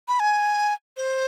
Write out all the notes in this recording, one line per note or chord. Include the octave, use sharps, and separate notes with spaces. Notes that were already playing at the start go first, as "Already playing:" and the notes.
B5
G#5
C5